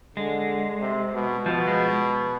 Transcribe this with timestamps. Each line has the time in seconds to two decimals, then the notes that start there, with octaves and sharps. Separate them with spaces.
0.16 D3 G#3
0.81 C3
1.14 B2
1.46 B2 F3
1.68 G#3